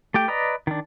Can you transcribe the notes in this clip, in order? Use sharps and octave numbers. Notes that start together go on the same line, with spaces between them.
A3 G4 G5
B4 D5 D#5 A#5
D#3 D4